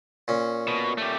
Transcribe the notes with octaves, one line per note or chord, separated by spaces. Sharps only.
A#2 C#4
B2
A3 G4